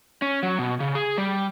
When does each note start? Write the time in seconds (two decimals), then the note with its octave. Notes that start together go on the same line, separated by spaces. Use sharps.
0.22 C#4
0.43 F#3
0.59 B2
0.80 C#3
0.95 G#4
1.18 G3